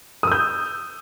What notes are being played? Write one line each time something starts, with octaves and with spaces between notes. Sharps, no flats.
D#6 E6 G6